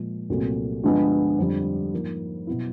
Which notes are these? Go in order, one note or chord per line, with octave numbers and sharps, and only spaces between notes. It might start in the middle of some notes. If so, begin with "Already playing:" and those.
Already playing: A#2 F3 G#3
C2 A#2 F#3 A3 C4
G2 D3 F3 G#3 B3
F2 D3 G3
G#2 F3 A#3
B2 F#3 B3 E4